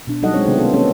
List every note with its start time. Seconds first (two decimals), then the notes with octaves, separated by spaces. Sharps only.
0.07 B2 D4
0.22 F#3 G3 D#4 A4 D#5 F#5
0.34 G#3 C4 D4 C#5
0.46 C3 D#3 G3 B3 D4 F4
0.58 A#3 B3 F4 A4
0.73 A#3 B3 C#4 G4 A4